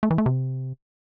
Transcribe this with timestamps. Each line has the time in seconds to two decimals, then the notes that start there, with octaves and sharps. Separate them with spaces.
0.03 A3
0.11 E3
0.18 A3
0.26 C3